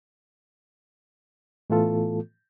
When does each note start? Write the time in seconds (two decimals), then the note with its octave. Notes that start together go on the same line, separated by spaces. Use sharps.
1.70 A2 E3 A3 B3 F4 A4